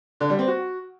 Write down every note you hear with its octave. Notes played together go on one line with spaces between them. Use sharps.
D3
G3
C4
F#4